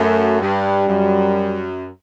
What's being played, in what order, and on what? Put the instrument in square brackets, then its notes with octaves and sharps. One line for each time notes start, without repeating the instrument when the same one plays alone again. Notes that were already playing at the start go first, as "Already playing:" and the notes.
Already playing: [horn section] F#2 [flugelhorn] A3
[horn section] G2 [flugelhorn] G3
[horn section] F#2